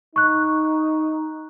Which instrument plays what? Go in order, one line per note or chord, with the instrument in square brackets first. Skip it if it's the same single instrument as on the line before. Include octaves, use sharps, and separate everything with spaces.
[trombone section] D#4 [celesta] C#6 F#6